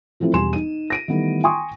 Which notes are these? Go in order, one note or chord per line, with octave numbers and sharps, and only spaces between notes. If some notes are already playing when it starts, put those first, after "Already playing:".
E3 F3 A3 C4 E4
E1 G3 G#5 C6 E7
D#4 D#7
A#6 D7 D#7
D#3 E3 G3 A3 B3
G5 G#5 C6 C#6 D#6